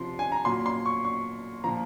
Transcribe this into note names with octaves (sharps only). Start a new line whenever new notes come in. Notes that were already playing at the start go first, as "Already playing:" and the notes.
Already playing: C3 F3 C6
G#5
A#5
A#2 F#3 C6
C6
C#6
C#6
A#2 F3 A#5